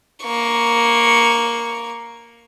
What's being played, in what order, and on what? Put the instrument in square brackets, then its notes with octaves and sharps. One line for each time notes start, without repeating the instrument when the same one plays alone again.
[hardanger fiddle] A#3 C#6